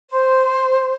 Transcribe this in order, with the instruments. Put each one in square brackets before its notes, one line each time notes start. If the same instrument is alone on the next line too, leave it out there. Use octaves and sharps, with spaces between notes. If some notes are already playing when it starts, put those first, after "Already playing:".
[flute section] C5